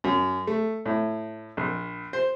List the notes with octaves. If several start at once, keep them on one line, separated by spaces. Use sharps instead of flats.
F#2
A3
A2
A#1
C5